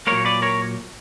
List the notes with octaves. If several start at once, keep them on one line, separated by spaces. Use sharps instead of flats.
A#2 F#3 A#3 A#4 C#5
B4 D5
A#4 C#5